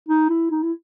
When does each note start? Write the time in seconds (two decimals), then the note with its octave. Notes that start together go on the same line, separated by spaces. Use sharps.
0.08 D#4
0.30 E4
0.51 D#4
0.63 E4